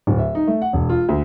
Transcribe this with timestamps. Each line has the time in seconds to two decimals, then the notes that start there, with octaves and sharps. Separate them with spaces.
0.07 D1
0.19 E5
0.35 D#4
0.47 A3
0.62 F#5
0.73 E1
0.89 F4
1.09 D2